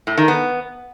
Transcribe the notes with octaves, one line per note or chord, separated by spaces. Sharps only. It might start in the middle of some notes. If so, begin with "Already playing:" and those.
A2
D#3
B3